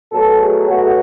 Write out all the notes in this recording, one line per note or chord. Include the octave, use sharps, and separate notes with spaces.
B2 F#3 A3 A4
G#4
B2 F#3 A3 F#4